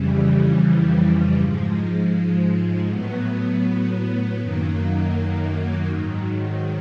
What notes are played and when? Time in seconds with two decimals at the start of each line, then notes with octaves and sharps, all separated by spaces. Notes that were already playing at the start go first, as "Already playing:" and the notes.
Already playing: F2 C#3 E3 G3
1.38 G#2 F3 G#3
2.89 A2 F#3 B3
4.41 F#2 D#3 F#3 A#3
5.92 G#2 D#3 F#3